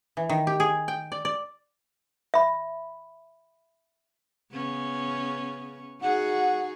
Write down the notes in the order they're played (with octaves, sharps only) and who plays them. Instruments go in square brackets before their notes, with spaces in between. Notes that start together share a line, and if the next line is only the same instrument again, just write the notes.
[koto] E3
D#3
G4
G#4
G5
D5
D5
[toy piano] E5 B5
[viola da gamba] C#3 B3 C#4
[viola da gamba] D#4 F#4 G#4 [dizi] F#5